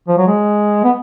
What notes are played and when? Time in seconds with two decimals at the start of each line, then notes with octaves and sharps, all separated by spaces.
0.08 F3
0.18 F#3
0.27 G#3
0.84 B3